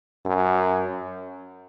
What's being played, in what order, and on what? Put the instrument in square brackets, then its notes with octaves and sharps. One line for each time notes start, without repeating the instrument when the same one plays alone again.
[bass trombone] F#2